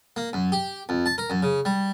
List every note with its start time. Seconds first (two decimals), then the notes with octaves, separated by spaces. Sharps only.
0.16 A#3
0.33 F#2
0.52 G4
0.89 F2
1.06 A5
1.18 A#4
1.30 F#2
1.43 C#3
1.65 G3